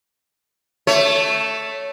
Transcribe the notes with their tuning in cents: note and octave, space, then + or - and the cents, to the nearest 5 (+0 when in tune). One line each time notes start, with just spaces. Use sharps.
A3 +0 C#5 +15